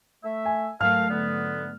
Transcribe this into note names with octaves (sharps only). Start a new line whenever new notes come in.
A3 E5
G#5
G#2 F#3 A3 A4 A#4 F5 F6
D3 B3